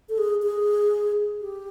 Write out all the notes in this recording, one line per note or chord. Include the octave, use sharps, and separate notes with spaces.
A4
G#4
G#4
G4